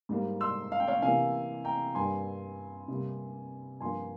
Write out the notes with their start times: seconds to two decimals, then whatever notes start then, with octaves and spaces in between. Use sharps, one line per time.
0.09 G#2 G3 A#3
0.41 C6 E6
0.72 F5
0.80 G5
0.88 C#5 F5
1.02 C3 E3 A#3 F5 G#5
1.64 G5 A#5
1.95 G2 G3 A#3 G#5 C6
2.88 C3 G3 A#3
3.80 G2 F3 A#3 G#5 C6